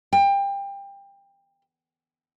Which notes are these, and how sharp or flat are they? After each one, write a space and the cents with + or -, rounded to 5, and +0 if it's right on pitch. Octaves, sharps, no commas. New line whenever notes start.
G5 +25